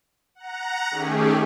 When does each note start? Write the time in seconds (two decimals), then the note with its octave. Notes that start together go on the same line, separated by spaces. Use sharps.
0.35 F#5 A#5
0.91 D#3 A3 C#4 G4 G#4